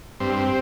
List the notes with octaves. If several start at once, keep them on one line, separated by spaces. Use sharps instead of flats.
G2 C4